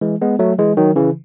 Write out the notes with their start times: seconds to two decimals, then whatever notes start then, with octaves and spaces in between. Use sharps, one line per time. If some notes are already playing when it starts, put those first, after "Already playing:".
0.01 E3 G#3
0.22 G#3 B3
0.39 F#3 A3
0.59 E3 G#3
0.77 D#3 F#3
0.96 C#3 E3